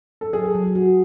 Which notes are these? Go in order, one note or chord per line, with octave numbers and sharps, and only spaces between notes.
A4
F#3 G#4
F#3
F#4